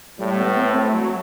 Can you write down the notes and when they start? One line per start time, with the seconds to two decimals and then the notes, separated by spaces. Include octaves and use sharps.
0.19 A2 G3
0.38 B3
0.56 C4
0.75 A3
0.94 F#3